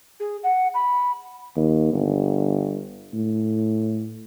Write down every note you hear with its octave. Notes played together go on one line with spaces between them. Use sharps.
G#4
F#5
B5
D#2
G1
A2